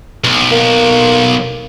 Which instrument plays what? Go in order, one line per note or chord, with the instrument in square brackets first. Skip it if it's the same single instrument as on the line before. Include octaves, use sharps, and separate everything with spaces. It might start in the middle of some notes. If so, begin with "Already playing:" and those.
[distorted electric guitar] B1
[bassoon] A#3